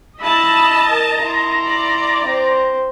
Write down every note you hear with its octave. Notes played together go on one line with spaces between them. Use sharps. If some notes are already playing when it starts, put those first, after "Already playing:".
E4 D#5 A5 B5 E6
A#4 A#5
E4 C6
D5
C4 C5